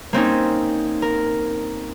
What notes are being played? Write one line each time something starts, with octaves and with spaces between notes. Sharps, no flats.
A#3 C4 C#4 D#4
A#4